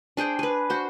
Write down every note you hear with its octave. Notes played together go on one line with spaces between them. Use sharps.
D4 G#4 C5 G5
G#4 B4
F#4 C5